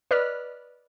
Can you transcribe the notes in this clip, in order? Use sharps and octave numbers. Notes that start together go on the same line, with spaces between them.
B4 D5 D#5 F6 F#6 B6